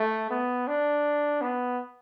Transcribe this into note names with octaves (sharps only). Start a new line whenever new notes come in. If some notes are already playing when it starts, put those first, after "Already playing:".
Already playing: A3
B3
D4
B3